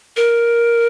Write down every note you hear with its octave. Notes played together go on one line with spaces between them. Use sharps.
A#4